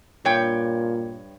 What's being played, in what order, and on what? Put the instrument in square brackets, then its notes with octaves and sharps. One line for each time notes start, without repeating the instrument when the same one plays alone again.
[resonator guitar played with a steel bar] G2 C#5 G5 [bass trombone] A#2